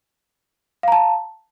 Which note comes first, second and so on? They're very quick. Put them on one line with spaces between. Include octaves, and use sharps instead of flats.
F5 A#5 A5